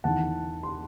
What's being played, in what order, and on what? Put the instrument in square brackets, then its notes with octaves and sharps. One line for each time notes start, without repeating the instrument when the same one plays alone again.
[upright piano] E2 D#3 F#5 A5
C6